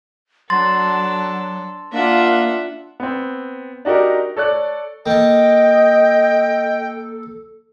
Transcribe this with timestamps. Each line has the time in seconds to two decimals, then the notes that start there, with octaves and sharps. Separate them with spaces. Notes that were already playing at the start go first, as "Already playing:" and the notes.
0.50 F#3 D4 A4 C6 A6
1.92 A#3 D4 F4 E5 F#5
3.00 B3 C4
3.85 D4 D#4 F#4 G4 A#4
4.36 A4 C#5 D5 F#6
5.06 A#3 A4 D#5 G5 A5